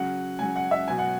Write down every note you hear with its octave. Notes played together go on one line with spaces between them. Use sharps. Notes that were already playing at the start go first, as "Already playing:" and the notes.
Already playing: C#3 F#3 F#5
C#3 F#3 G#5
F#5
E5
B2 F#3 G#5
F#5